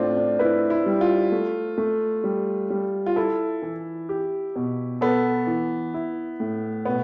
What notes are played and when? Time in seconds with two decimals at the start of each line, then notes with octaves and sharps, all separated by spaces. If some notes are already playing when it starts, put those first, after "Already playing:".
Already playing: A2 C4 D4 F4
0.17 D4
0.39 E4 B4
0.70 E4
0.86 G3
1.01 F4
1.32 A3
1.78 A3
2.24 G3
2.70 G3
3.06 F4
3.16 E4 A4
3.62 E3
4.09 G4
4.56 B2
5.01 B3 A4
5.47 E3
5.94 E4
6.40 A2
6.85 B2 B3